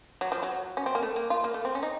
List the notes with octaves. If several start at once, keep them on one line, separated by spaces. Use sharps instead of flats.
F#3
F3
F#3
C#4
C4
A#3
A3
A#3
F4
A#3
A3
C4
C#4
D#4